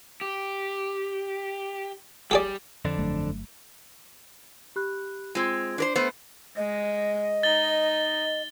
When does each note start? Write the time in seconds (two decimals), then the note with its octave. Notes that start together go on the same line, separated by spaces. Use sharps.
0.21 G4
2.31 G3 G4 G#4 D5
2.85 F2 D3 D4
2.99 G1 F#3 A3
4.76 G4 B5 F#6
5.35 G#3 C4 F4 G#6
5.78 D4 A#4 C5
5.95 A3 B3 C5
6.57 G#3 D#5
7.43 D#4 A6 G7